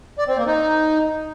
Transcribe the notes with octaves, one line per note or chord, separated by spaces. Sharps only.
D5
C4
A#3
D#4